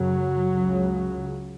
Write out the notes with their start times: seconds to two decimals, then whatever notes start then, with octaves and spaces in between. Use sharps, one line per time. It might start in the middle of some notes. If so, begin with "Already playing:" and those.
Already playing: F#2 C#3 F#3
0.49 C#2 C#3